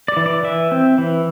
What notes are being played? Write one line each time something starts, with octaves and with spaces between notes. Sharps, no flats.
D5
E3
D5
E3 E5
C4
E3